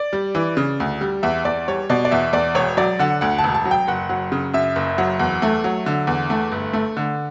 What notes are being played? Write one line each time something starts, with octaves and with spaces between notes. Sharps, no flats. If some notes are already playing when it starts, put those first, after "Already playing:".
Already playing: D5
G3
E3
C#3
D2
G3
E2 E5
E2 D5
G3 C#5
B2 D5
D5
E2 E5
E2 D5
E1 C#5
F#3 D5
D3 F#5
D2 F#5
A5
E1
A5
F#3
G5
F#1 F#5
F#3
C#3
F#2 E5
F#1
F#3
E2
A3
F#3
D3
E2
A3
G1
A3
D3